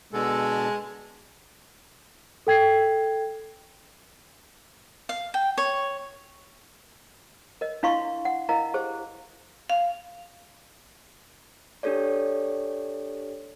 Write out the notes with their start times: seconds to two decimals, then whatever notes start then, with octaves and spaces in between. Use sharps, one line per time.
0.13 B2 D3 G#3 A4
2.47 A4 G5 G#6 C7
5.09 F5
5.34 G5
5.58 C#5
7.61 A#4 D#5
7.83 D4 E4 F5 C6 C#6
8.25 F#5
8.49 E4 A#4 D#5 F5 A#5
8.74 G4 G#4 C5
9.70 F5
11.83 D4 G4 A4 C#5 D5